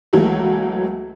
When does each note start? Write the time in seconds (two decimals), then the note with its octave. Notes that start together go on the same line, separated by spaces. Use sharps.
0.13 C#2 E3 F#3 A3 A#3